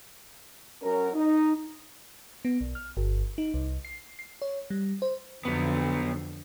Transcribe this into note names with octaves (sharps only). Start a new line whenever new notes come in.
F#2 F#3 C#4 A#4
D#4
B3
B1
F6
G1
D#4
C2
C7
C7
C#5
G3
C5
F2 D3 F#3 B3